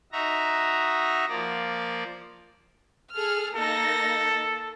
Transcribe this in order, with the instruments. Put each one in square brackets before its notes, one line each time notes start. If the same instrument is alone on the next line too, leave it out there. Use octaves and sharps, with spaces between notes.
[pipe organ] D#4 F#4 E5 A#5
F3 A#3 D5
[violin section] G#4 A4 F6
[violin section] A#3 D#4 A#6 [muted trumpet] A4